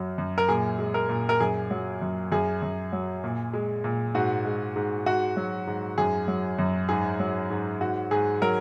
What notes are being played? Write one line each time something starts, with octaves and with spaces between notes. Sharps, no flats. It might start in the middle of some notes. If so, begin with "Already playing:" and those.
Already playing: F#2 F#3
F#2
A#4
A#2 G#4
G#3
A#4
A#2
A#4
F#2 G#4
F#3
F#2
F#2 G#4
F#2
F#3
A#2
G#3
A#2
G#2 F#4
G#3
G#2
G#2 F#4
F#3
G#2
F#2 G#4
F#3
F#2
G#2 G#4
F#3
G#2
G#2 F#4
G#2 G#4
F#3 A#4